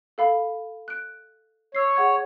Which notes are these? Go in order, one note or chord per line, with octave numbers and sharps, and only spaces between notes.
A4 F5 B5
F#6 D7
C#5 E6 C7
G#4 F#5 G#6